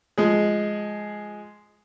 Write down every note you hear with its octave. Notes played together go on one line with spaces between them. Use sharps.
F3 G#3 G#4